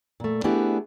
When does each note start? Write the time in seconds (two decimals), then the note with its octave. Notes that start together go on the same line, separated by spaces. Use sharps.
0.20 A#2 A3
0.44 A3 B3 D4 E4 G4 G#4